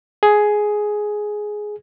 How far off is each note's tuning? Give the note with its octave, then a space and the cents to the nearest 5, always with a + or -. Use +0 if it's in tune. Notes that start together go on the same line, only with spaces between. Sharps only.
G#4 +10